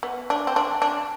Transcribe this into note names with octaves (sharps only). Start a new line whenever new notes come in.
B3
D4
C4
D4
D4